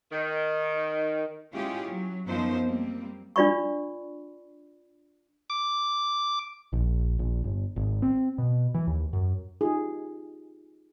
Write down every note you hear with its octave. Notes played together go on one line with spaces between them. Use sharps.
D#3
G#3 C#4 E4 F4 G4 G#4
F#3
F#2 F3 F#3 B3 D#4 C5
G3 A#3 C4
D4 F4 D5 B5 C#6
D6
A#1
A#1
G1
G#1
C4
B2
E3
D#2
F#2
D#4 F4 G4 G#4